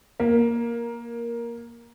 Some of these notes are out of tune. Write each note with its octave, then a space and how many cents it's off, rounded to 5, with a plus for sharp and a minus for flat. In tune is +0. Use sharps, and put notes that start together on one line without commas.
A#3 +5